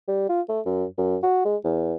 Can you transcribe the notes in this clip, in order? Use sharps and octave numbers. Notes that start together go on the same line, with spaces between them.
G3
F4
A3
F#2
F#2
F#4
G#3
E2